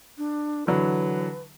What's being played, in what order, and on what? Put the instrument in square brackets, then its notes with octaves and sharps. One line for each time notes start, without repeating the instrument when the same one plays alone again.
[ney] D4
[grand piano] D3 E3 F#3 [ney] B4